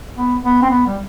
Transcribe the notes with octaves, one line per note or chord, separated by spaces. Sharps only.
B3
B3
C4
B3
G3